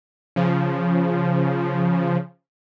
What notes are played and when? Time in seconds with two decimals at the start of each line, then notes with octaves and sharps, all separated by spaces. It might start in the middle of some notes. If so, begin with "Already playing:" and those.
0.36 C#3 F3